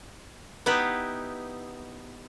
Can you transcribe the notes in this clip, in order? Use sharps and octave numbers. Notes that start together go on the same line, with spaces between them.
B3 D#4 E4 G4 B4